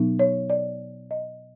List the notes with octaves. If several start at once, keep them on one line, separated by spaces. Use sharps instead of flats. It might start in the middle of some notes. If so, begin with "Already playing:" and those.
Already playing: B2 F#3 B3 D#4
C#5
D5
D#5